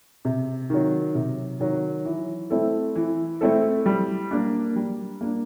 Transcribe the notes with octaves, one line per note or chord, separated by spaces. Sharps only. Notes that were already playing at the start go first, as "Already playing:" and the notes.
C3
D#3 F#3
C3
D#3 F#3
E3
A3 C4 E4 A4
E3
A3 C4 E4 A4
G3
A#3 D4
G3
A#3 D4